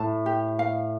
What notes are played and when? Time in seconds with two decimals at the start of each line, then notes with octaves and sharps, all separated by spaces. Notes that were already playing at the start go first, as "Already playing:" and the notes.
Already playing: A2 A5
0.26 G4
0.59 F5